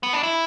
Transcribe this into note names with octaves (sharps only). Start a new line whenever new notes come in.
B3
D4
E4